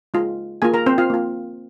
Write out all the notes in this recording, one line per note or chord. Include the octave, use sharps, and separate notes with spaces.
G#3 F4
A#3 F4 G#4 G#5
A#4 A#5
C4 C5
F4 F5
A#3 F4